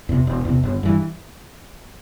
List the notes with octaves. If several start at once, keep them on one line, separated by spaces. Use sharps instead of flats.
E2 C3
E1
E2 C3
G1
G2 E3